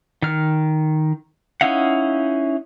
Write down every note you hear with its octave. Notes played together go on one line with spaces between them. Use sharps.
D#3 F6
C#4 D#4 E4 F5 F#5